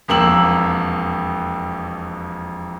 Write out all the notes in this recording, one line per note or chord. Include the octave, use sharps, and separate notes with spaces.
E1 F2 A#3 E6 F#7